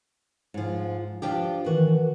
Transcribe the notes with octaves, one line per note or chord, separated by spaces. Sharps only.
G#2 F3
F3 D4 G4
D#3 E3 F#4